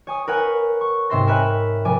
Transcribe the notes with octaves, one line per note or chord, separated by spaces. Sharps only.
C#5 G#5 D#6
A#4 B4 C#5 F#5 G#5
C#6
G#2 C3 C4 E5 C6 A#6
A#4 C#5 E5 G#5 B5 F#6
F1 G#5 D6